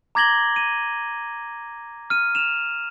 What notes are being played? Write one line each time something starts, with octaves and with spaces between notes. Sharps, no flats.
A#5 D6 G#6 A#6 F#7 G7
D#7
F6 D#7
E7 F7